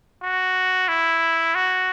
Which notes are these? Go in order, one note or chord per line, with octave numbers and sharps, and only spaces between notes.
F#4
E4
F#4